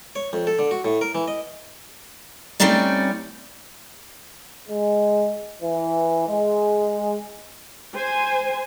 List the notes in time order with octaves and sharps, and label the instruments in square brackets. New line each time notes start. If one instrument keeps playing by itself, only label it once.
[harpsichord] C#5
F2
A4
D3
F#4
A2
A#4
E3
D#5
[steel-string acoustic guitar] G3 A3 C4 C#4 D#4 D5
[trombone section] G#3
E3
G#3
[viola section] C5 G#5